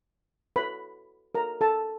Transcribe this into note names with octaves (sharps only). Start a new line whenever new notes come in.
F#4 A4 B4 C#5 B5
F#4 A4 A#4 C#5 A#5
A4 A5